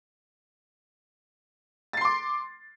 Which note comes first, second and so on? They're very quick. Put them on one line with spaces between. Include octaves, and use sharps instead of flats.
A6 C7 C6 D6